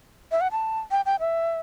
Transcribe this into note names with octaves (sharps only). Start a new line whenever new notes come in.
E5
F#5
A5
G5
G5
E5